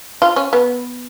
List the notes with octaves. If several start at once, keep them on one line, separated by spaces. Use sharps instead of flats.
F4
C#4
B3